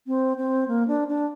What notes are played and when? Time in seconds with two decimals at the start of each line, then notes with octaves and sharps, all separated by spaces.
0.07 C4
0.37 C4
0.68 A#3
0.87 D4
1.08 D4